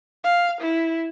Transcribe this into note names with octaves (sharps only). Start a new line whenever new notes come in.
F5
E4